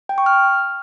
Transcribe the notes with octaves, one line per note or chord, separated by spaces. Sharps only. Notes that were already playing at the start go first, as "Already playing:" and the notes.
G5
C#6
F6